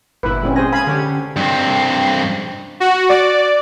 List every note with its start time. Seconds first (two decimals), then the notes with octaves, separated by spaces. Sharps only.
0.23 G1 A#2 E4 B4
0.43 G#3 C4 C#4
0.56 G#4 C5 G#5 A#6
0.72 F5 G#5 B5 D#6 G#6
0.87 D3 C#4 G4
1.36 G2 C4
2.80 F#4
3.09 D5